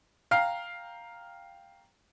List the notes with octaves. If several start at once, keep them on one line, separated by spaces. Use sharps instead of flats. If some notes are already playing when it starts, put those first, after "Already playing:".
F5 G5 A#5 F6 C7